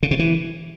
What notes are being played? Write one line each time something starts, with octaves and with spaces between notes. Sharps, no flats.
C#3
B2
E3